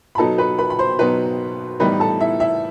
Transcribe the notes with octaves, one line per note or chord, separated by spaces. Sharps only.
B5
B2 F#3 B3 D#4 A4 A5
B4 B5
B4 B5
B5
C5 C6
B2 F#3 B3 D#4 B4 B5
A2 E3 G3 B3 D#4 B4 B5
A4 A5
E4 E5
E4 E5